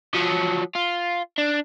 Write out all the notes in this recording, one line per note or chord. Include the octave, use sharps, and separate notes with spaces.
F3 F#3
F4
D4